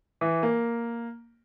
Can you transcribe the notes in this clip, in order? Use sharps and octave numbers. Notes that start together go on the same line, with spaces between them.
E3
A#3